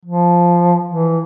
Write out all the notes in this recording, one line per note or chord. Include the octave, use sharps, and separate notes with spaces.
F3
E3